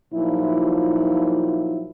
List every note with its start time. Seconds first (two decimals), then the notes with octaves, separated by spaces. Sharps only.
0.13 A#2 F3 F#3 D#4 E4